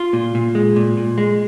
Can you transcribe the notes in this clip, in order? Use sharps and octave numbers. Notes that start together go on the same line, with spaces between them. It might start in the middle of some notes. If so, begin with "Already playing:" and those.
Already playing: F4
A#2
A#2
G#3
A#2
A#2
G#3